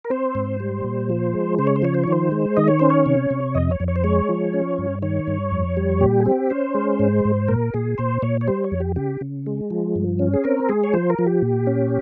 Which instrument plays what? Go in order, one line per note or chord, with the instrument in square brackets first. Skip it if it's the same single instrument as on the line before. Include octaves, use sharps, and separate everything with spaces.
[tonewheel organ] A#4
C4 C5
G#2
G3
A#2
F3
G#3
C#3 C5
C#5
C5
F3 C#5
C5
C#5
D#3 C5
G#3
D#3 D#5
C#5
C#4 C5
C#5
C3
C3
F2 D#5
C#5
F2
C#5
C5
G#3 C#5
F3
C#4
G2
D#3 C#5
G2
F2
G3
A#2 G4
G#4
C4 G4
C#4 C5
G#3
G#2
G#2
A#2 A#4
A#2 G#4
A#2 C5
A#2 C#5
C#5
G3 C5
C#5
F2
G4
C#3 G4
C#3
G#3
F3
G2
C#4
G#4
C4 A#4
G#3 G#4
C#5
F3 C5
A#4
F3
G4
A#2
C#4